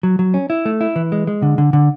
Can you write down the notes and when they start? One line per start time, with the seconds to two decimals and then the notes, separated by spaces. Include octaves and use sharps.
0.03 F#3
0.19 F#3
0.34 C#4
0.50 E4
0.65 A3
0.81 E4
0.96 E3
1.12 G#3
1.27 G#3
1.42 D3
1.58 D3
1.73 D3